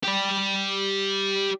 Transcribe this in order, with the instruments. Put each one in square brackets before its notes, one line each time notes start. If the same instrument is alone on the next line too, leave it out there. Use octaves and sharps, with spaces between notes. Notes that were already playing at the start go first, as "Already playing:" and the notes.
[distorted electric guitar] G4 D5